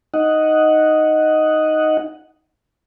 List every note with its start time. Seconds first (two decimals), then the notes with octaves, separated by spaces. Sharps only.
0.14 D#4 D#5 F#5